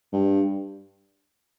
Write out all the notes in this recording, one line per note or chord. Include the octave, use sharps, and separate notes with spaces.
G2